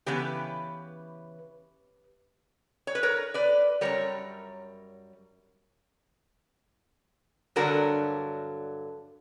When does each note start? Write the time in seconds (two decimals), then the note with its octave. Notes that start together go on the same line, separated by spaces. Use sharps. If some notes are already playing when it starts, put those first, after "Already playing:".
0.06 C#3 E3 B3 G4 B4
2.87 C#5
2.95 B4
3.03 A#4 C#5
3.34 B4 D5
3.81 F#2 C#3 G3 A#4 C#5
7.56 G2 D3 F#3 F#4 A#4